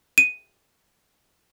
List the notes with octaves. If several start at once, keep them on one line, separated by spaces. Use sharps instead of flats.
D#7